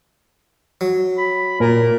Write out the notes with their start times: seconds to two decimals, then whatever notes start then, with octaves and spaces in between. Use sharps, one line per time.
0.81 F#3
1.18 B5
1.60 A#2 A#4